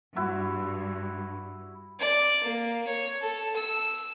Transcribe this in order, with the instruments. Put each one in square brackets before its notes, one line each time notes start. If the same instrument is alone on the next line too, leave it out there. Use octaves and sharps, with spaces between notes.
[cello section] G2 [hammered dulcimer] E4 F#4
[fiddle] D5
A#3
C#5
A4
E6